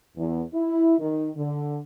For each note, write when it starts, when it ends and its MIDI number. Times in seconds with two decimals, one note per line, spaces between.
0.16 0.42 40
0.53 0.97 64
1.00 1.28 51
1.36 1.78 50